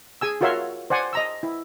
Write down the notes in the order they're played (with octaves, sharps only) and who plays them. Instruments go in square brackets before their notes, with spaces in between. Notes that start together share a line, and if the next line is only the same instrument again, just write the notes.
[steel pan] G#4 G#5 E6
F4 F#4 A#4 C#5 E5 C6
C5 D5 F#5 G#5
D#5 A#5 E6
E4